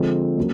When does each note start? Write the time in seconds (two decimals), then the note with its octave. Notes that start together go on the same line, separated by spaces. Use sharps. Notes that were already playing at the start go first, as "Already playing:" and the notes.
Already playing: D3 F3 G#3 C4
0.37 C#3 F#3 A#3